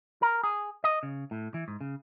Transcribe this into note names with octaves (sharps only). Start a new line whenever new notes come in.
A#4
G#4
D#5
C#3
A2
E3
G#2
C#3